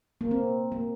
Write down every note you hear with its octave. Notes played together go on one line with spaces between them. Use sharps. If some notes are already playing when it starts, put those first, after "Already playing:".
A#3
C4
A#3